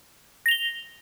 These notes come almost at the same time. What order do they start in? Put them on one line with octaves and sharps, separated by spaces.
A#6 F7 G7